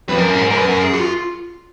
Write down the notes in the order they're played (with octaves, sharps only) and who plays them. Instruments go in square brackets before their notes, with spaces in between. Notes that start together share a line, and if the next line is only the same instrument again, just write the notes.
[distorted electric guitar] F2 [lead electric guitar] B4
[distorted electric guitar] F#2 [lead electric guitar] A#4
[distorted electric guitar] G#2
[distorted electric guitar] F#2 [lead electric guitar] A#4
[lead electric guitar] B4
[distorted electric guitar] F#2 [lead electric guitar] A#4
[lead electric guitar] G#4
F#4
F4